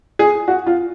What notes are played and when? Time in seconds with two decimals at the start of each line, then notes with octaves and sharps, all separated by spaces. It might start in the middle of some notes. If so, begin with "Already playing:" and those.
0.19 G#4
0.48 F#4
0.66 F4